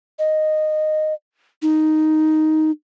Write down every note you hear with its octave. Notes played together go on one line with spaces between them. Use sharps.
D#5
D#4